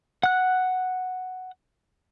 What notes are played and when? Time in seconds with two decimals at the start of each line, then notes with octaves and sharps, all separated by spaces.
0.23 F#5 F#6